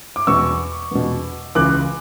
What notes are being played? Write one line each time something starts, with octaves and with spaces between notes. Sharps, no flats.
D6
E2 B2 C#6 E6
E2 B2
C#2 C#3 E3 D6 F#6